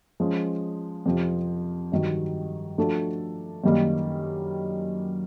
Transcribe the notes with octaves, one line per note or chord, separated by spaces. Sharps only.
F3 G#3 C#4
F2 C3 F3
G2 D#3 F#3
F3 A3 D4 F#4 A4
F#2 D#3 G3 A#3 D#4